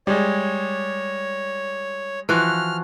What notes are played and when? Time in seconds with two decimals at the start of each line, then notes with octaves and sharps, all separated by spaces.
0.07 G3 G#3 C#5
2.29 E3 F3 F#4 F6